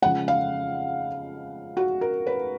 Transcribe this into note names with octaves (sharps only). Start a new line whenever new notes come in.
C#3 F3 G#3 F#5
F5
F#4
A#4
B4